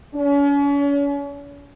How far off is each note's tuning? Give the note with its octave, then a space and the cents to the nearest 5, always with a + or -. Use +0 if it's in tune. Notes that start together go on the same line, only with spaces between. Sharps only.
C#4 +40